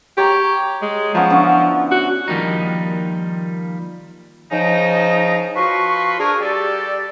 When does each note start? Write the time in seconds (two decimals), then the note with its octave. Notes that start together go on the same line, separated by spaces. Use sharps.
0.18 G4 C#5 A#5
0.82 G#3
1.15 F3 F#3 B3 C#4
1.30 D3 E3 C#4
1.91 F#4
2.28 D#3 F3 G3 A#3 D#4
4.51 C#3 F3 D#4
5.56 F3 F#4 B4 C6 C#6
6.19 D4 G#4 A#4 G#5 C#6
6.41 G3 G4 A4 D5